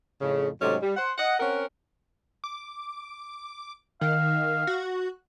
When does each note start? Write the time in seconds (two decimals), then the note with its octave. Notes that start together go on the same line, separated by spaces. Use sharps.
0.21 F2 A2 C#3
0.62 G#2 C3 F#3 A3 C#4
0.81 G3
0.97 C5 F#5
1.18 D#5 F#5
1.39 C4 C#4 A#4 F#5
2.44 D6
4.01 D#3 F5
4.67 F#4